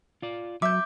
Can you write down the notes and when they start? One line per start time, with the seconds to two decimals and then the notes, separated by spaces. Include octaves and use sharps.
0.22 F4 D5
0.62 F#3 E5 D6 G6